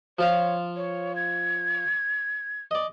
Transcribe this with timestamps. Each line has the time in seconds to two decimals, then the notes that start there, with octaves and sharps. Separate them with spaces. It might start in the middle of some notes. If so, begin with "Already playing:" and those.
0.19 F3 F4 C#5 F5
0.76 C#5
1.16 G#6
2.71 D5 D#5